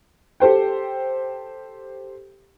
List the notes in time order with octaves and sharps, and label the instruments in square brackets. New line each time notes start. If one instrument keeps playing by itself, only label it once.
[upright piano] G4 A4 C5 G5